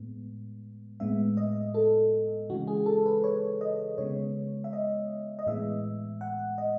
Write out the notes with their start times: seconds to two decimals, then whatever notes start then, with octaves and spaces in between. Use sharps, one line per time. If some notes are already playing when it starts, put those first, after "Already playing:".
Already playing: A2 G#3 B3
1.00 A2 G#3 B3 E5
1.37 D#5
1.74 A4
2.49 C#3 E3 G#3 F#4
2.67 G#4
2.86 A4
3.06 B4
3.24 C#5
3.61 D#5
3.98 C#3 G#3 B3 C#5
4.64 E5
4.73 D#5
5.39 D#5
5.46 A2 E3 G#3 B3 E5
6.21 F#5
6.58 D#5